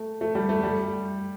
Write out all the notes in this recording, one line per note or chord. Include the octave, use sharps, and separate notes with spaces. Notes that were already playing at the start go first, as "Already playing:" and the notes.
Already playing: A3
A3
G3
A3
G3